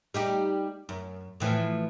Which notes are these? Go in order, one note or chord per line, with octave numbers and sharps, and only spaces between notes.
G3 D#4 G4
F#2
A2 E3 F3